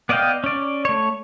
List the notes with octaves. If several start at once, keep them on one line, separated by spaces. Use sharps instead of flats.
B3 D5 D#5 F5 G5
C#4 D5
A3 C#5